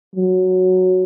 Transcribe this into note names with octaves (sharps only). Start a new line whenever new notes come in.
F#3